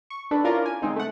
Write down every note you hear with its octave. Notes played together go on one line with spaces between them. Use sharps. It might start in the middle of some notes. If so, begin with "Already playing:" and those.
C#6
D4 A4 B4
C#4 E4 F4 A#4 D5
G#5
C#3 G#3 C4 D#4
A3 F#5